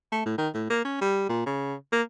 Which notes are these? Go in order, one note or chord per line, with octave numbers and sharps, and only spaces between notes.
A3
A2
D#3
A2
A#3
C#4
G3
A#2
C#3
A#3